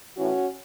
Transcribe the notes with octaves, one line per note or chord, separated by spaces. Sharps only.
A2 E3 C#4 F#4